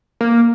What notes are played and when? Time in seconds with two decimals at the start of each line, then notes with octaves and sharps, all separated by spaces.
0.21 A#3